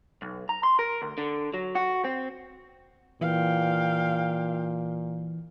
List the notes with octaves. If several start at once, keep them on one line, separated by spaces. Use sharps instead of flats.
B1
A#5
C6
A#4
D2
D3
F#3
F#4
C4
A#2 E3 F5 G5